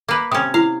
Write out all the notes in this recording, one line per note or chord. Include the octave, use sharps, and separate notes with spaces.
A#3 B4 D6
C3 C#4 D#6
E4 F5